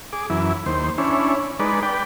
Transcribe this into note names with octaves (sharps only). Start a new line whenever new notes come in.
G#4 D6
F#2 E3 E4
D#2 C5
C#4 D4 E4
G#3 D#4 B4 D5
B4 D5 G5